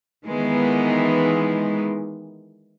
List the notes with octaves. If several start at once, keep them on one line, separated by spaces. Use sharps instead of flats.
D#3 E3 G#3 B3